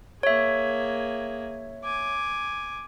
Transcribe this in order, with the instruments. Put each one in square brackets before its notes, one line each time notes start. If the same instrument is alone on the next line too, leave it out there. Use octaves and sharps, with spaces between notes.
[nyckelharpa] A#3 G#4 [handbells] C#5 E5
[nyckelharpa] G#5 D6